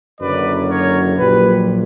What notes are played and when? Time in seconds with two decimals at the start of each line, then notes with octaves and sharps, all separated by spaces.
0.20 F#1 F#2 D3 F#3 B4 D5
0.69 A#4 C#5
1.16 A#1 A#2 F#3 G4 B4